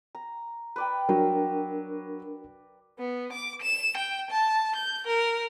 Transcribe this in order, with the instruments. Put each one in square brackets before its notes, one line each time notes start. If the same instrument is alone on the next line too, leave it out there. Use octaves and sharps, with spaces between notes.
[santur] A#5
B4 D5 G5
[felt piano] F#3 [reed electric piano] D4 A#4
[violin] B3
D6
E7
G5
A5
G6
A#4